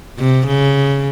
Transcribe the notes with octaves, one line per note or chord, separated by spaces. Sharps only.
C3
C#3